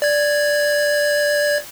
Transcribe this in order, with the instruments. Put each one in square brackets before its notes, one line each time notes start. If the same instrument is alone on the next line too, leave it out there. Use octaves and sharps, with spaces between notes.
[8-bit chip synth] D5 G#6